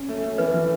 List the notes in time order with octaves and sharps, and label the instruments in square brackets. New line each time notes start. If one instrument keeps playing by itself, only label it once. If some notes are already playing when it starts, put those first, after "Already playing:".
Already playing: [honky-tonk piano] C#4
A3
A3
[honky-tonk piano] E3 [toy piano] B4
[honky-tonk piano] E3